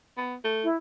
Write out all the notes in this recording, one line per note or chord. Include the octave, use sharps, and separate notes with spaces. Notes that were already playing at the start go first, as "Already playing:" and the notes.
B3
A3
E4